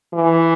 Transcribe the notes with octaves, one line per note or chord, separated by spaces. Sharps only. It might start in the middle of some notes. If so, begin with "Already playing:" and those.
E3